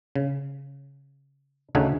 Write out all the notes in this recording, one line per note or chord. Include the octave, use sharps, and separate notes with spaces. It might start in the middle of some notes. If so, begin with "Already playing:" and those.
C#3
D2 C#3 A3 D#4 F#5 G#5